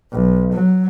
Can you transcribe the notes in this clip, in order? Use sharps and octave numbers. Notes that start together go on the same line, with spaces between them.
B1
F#3